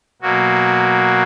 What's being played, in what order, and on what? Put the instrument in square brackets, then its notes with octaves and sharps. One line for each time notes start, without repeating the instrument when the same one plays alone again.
[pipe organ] B2 F#3 A#3 F#4